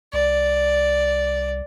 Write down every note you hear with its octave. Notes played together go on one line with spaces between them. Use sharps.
C2 D5